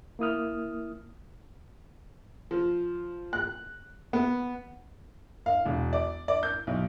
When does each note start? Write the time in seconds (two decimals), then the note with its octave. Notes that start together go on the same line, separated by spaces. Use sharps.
0.19 A#3 E4 D#6 F6
2.51 F3
3.33 F#6
4.13 B3
5.46 F5
5.66 E1
5.93 D5
6.28 D5
6.43 G6
6.67 B1